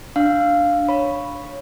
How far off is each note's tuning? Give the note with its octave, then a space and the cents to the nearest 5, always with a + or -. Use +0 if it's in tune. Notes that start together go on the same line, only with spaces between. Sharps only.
D4 +0 F5 +0
C#5 +0 B5 +0